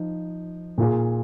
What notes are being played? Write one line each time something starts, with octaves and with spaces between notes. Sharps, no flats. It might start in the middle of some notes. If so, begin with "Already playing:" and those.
Already playing: F3 D#4
A#2 A#3 F4 G#4